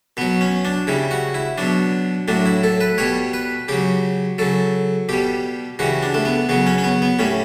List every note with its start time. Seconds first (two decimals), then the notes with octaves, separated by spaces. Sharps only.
0.17 B2 F#3 B3
0.41 C#4
0.65 D4
0.87 C#3 G3 E4
1.11 F#4
1.34 E4
1.58 B2 F#3 D4
2.28 A2 F#3 D4
2.46 E4
2.64 A4
2.81 B4
2.98 B2 G3 C#5
3.33 B4
3.68 C#3 F#3 G4
4.38 C#3 F#3 A4
5.09 B2 G3 G4
5.79 C#3 E3 G3 F#4
6.03 D4
6.14 A3
6.25 B3
6.49 C#3 F#3 B3
6.66 C#4
6.78 C#4
6.84 B3
7.02 B3
7.19 A2 G3 C#4